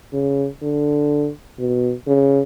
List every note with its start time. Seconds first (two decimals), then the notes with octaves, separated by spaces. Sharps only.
0.13 C#3
0.62 D3
1.59 B2
2.07 C#3